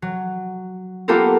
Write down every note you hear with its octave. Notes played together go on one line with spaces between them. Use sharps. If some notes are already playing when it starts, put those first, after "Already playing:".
F#3
A#3 B3 F4 G4 A4 A#4